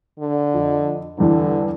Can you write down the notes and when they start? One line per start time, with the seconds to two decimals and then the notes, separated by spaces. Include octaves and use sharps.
0.19 D3
0.54 F2
1.18 E2 G2 D3 E3